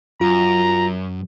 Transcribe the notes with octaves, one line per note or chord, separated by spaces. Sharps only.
F#2 F4 A#5